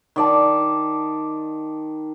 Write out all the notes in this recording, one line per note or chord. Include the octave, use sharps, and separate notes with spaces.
D#3 D5 A5